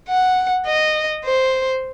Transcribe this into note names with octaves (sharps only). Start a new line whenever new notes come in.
F#5
D#5
C5